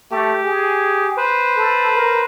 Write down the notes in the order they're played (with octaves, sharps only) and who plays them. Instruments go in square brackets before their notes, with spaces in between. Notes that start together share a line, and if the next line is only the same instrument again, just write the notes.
[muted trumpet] A3 [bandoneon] G4
[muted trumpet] G#4
[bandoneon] B4 C5
[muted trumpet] A4
A#4